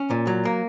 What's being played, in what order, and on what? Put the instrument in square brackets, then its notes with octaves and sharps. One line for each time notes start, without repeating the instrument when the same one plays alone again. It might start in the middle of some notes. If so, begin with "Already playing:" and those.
Already playing: [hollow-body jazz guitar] C#4
A#2
F#3
A#3